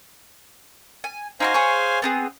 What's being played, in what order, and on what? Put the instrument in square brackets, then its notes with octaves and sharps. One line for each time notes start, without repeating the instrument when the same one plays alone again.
[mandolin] G#5
[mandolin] D#4 E4 F#4 [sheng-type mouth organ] C5 F5 G#5
[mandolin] G#4 C#5 C#6
B3 C4 G#4